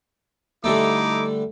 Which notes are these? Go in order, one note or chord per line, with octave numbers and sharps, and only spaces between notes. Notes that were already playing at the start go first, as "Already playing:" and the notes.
D3 G3 A3 D#4 E4 D6